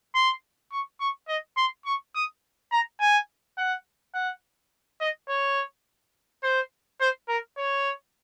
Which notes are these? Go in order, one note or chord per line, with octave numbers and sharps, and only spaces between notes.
C6
C#6
C#6
D#5
C6
C#6
D#6
A#5
G#5
F#5
F#5
D#5
C#5
C5
C5
A#4
C#5